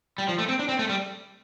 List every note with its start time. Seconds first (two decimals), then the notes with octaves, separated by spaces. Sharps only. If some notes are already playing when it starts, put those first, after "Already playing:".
0.18 G3
0.29 F3
0.38 A3
0.48 C4
0.59 D4
0.69 C4
0.79 A3
0.89 G3